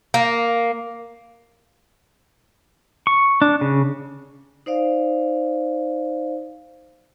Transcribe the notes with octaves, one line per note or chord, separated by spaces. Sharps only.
A#3
C#6
D4
C#3
D#4 C5 D5 F5